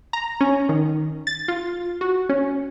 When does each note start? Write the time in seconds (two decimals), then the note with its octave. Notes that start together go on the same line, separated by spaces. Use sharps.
0.13 A#5
0.41 C#4
0.69 D#3
1.27 A6
1.48 F4
2.01 F#4
2.29 C#4